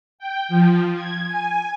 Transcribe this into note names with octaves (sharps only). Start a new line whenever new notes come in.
G5
F3
G#6
G#5